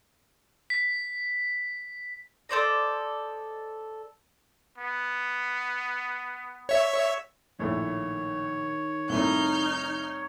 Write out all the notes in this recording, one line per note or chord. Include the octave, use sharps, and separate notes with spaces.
B6
A4 C5 D5 D#5
B3
C#5 E5
A#1 A2 D#3 C#5
C2 A2 D#4 F6 G6